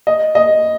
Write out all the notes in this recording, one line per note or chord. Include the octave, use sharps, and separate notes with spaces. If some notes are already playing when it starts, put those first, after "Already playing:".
D#5
D#5